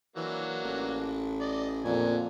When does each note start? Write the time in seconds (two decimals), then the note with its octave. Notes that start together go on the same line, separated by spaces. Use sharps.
0.16 E3 F#3 A#3 D4
0.64 A1
1.40 D5 D#5
1.85 F2 A#2 D3 G#5